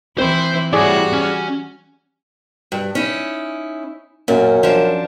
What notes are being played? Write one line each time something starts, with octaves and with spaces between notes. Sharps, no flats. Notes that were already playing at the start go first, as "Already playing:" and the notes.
E3 C4 E4 C5 C6
G3 E4 F#4 G#4 C#5 D5
C#4
G2
C#4 D#4 E4
F#2 A#2
F3 D4